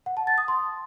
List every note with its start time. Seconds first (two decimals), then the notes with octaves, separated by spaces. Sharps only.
0.06 F#5
0.17 A5
0.27 A6
0.38 D#6
0.48 C6